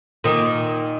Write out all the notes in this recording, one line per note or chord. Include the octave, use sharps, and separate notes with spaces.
A#2 D#3